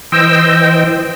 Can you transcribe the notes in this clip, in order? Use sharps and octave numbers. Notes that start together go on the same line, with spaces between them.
E3 C5 D#5 G5 E6